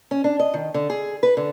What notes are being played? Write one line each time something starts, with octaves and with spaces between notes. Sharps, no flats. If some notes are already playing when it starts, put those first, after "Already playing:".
C#4
D4
D#5
D#3
D3
G#4
B4
D3